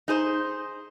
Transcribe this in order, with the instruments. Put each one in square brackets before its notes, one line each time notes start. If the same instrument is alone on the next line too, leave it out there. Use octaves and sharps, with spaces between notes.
[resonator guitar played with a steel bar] D#4 G#4 C5